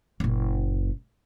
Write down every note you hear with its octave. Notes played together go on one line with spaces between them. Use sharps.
F#1 A#2